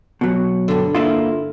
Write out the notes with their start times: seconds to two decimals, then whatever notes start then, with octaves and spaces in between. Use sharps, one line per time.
0.21 B2 F#3
0.68 G2 D3
0.95 A#3 E4 F4